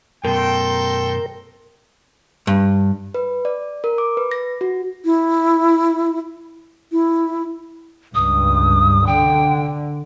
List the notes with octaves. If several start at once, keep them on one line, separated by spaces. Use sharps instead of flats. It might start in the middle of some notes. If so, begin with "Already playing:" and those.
F#2 B2 A4 A#4 G5 C6
G2
B4
D5
A#4
D6
B4
A#6
F#4
E4
E4
C#2 G2 D#6
D3 G5